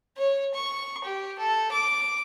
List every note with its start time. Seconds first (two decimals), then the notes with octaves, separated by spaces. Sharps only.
0.17 C#5
0.54 C#6
1.04 G4
1.39 A4
1.72 D6